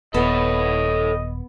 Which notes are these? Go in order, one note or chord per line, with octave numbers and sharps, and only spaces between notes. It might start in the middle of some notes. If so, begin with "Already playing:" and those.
D#1 B3 A4 C#5 D#5